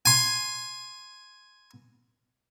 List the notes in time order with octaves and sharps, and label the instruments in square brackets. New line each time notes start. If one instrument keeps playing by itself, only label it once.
[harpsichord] G#5 C6